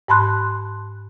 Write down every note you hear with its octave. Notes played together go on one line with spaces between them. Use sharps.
G#2 A5 B5 C6 F#6